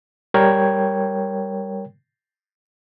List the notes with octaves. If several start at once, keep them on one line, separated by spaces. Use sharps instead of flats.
G3 A#4 C#5 G5 G#6